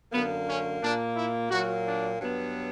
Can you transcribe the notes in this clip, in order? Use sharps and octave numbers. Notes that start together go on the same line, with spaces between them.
F#2 D3 A#3 B3
C#4
A#2 A#3 D4
E4
A#2 F#3 A#3 F#4
D4
G2 F#3 B3